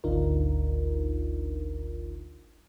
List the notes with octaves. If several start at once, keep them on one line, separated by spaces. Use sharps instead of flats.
G#1 D2 D4 D#4 F4 A#4